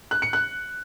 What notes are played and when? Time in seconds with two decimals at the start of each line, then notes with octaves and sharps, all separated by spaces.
0.11 F#6
0.22 C#7
0.33 F#6